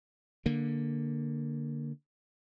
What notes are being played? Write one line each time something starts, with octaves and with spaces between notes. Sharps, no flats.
D3 A#3